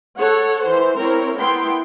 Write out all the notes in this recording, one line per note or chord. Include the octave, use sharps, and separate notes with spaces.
A4 C#5 F#5
E3 C5
C4 E4 A#4 C#5
B3 E4 A#4 G5 C6